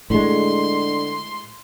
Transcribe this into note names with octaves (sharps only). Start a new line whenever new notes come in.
A2 D3 G#3 C6